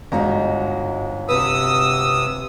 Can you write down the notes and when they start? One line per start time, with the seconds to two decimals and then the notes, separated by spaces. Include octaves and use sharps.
0.12 G1 G#2 G#3 D#4 F#4 A#5
1.29 C3 F#4 B4 D#6 E6